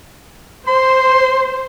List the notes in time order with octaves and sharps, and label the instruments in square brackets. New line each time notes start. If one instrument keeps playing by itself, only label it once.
[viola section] C5 [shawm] C6